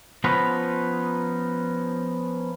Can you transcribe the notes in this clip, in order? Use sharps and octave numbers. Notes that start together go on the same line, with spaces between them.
F3 B3 C#4 D#4 F4 B4